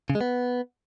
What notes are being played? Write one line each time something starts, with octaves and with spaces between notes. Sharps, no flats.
C#3
G#3
B3